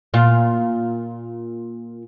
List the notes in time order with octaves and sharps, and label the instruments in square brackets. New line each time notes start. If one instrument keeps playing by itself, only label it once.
[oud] A#2 F4